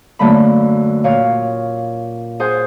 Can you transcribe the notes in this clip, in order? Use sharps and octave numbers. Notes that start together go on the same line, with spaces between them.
F#2 D3 A3 A#3 B5
A#2 F4 C#5 F5
G#4 C5 F#5 G#5